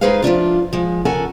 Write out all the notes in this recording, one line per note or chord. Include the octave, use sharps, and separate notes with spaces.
G#3 D#4 G#4 B4 C5 F5
F3 A3 D4 F4
F3 G#3
C#3 A4 A#4 F#5 G#5